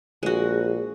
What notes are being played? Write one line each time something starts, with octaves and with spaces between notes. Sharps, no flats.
A#1 G#3 F#4